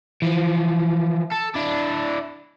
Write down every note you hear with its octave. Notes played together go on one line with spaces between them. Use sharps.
E3 F3
A4
D4 E4